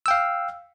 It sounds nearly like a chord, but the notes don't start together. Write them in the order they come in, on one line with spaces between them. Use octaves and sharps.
E6 G5 F5